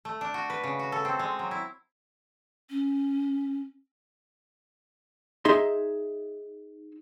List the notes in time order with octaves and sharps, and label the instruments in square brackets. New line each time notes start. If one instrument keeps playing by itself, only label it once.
[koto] A3
D4
F#4
B4
C#3
F#4
A4
C4
G#3
F#3
E4
[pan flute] C#4
[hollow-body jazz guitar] D#4 G#4 E5 C6